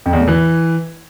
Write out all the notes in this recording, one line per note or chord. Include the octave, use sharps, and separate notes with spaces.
F2
E2
A2
E3